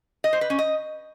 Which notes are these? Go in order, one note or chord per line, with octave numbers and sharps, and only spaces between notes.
D#5
C5
B4
C#4
D#5